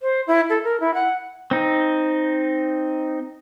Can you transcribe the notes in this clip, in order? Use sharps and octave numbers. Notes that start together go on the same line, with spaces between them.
C5
E4
A4
A#4
E4
F#5
C4 D#4